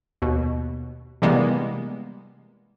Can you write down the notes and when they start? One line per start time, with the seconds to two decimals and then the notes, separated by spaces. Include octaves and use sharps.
0.22 D#2 B2
1.22 C3 E3 G3 G#3 A#3 B3